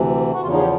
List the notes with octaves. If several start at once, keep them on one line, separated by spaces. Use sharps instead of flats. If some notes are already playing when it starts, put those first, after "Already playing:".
Already playing: D2 C3 E3
F#4
E2 C#3 F3 F4
D#4
G#4
G4